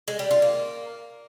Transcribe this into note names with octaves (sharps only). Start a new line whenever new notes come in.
G#3
G3
F4
A#3